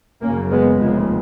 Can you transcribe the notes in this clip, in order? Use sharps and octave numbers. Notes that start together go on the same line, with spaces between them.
F#1 F#2 C#3 A#3 C#4
G#3 B3
F1 D#2 C#3 F3 G#3